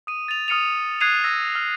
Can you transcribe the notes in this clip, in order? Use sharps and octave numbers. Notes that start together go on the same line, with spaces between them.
D#6 D#7
A6 F7
D#6 F6 C#7 D#7 F7
D#6 F#6 G#6 C7 D#7 F7
E6 A#6
F6